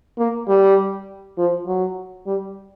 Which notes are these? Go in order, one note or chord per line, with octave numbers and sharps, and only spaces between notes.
A#3
G3
F3
F#3
G3